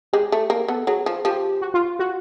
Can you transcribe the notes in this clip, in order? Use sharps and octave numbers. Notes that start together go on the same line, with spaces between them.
G#3 G4
A3
A#3
B3 A4
F#3 G#4
F3
F3 G4
F#4
F4
F#4